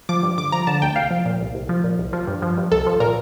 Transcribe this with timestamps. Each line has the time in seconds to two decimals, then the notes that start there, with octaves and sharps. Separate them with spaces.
0.09 F3 D6
0.23 G2
0.38 D2 D6
0.52 F3 A#5
0.67 D3 A5
0.82 D2 G5
0.96 C2 F5
1.11 F3
1.25 A#2
1.40 C2
1.55 C2
1.69 F3
1.84 A#2
1.99 C2
2.13 F3
2.27 G2
2.42 F3
2.57 G2
2.72 C2 A4
2.86 F3
3.00 A#2 A#4